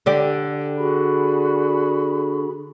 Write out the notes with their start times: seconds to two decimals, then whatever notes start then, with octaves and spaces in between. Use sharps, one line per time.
0.06 D3 G4 D5
0.77 F#4 G#4 B5